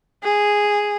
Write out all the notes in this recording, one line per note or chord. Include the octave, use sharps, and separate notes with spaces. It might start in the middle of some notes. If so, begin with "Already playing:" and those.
G#4